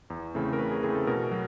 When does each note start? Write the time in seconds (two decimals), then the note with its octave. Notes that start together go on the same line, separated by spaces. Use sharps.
0.10 E2
0.34 C#3 E3 A3 C4
0.53 A#4
0.59 E2 B4
0.71 G#4
0.83 C#3 E3 A3 C4 G#4
0.95 A4
1.07 B2 A#4
1.32 F#3